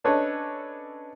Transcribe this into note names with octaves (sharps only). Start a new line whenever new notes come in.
C#4 D4 A4 B4 C#5 D#5